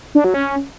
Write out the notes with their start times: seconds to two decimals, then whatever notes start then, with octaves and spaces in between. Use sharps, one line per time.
0.15 D4
0.24 F#3
0.34 C#4